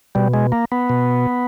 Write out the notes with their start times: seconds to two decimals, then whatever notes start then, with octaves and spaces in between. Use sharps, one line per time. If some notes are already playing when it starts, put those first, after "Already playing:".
0.15 B2 G3
0.34 G#3
0.52 A#3
0.72 B3
0.89 B2